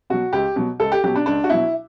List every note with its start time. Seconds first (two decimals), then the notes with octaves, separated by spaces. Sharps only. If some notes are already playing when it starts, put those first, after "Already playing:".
0.10 B2 F#3 F#4
0.33 C#2 G4
0.56 B2 F#3
0.80 C#2 A4
0.92 G4
1.04 B2 F#3 G4
1.15 D4
1.26 C#2 D4
1.44 F#4
1.50 B2 F#3 E4